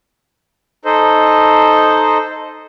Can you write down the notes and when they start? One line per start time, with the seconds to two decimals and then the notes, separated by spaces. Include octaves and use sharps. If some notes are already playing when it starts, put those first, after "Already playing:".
0.85 D#4 A4 C5 D#5